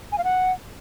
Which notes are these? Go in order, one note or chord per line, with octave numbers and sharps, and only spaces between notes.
G#5
F5
F#5